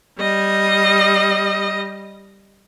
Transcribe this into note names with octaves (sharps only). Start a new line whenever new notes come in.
G3 D#5